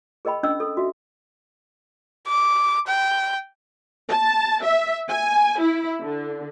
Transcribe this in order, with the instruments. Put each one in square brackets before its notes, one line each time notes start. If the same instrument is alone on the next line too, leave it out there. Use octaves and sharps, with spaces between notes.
[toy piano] G#4 A#4 D#5 G5 B5
C#4 D4 D#5 G5 E6
A4
F#4 E5
[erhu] D6
G5
[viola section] A5
E5
G#5
E4
D3